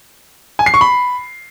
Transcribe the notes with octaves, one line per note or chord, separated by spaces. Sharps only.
G#5
C7
C#6
B5